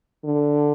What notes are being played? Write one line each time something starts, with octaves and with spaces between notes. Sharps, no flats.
D3